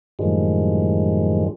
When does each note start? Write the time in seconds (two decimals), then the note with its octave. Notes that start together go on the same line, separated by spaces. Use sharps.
0.19 F#2 A2 D#3 F3 G3 G#3